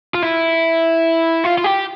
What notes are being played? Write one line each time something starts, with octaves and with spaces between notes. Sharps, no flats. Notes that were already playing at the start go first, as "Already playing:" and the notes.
F4
E4
F4
F4
G4